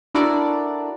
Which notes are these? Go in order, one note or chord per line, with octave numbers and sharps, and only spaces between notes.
D4 E4 F#4 A4 A#4 D5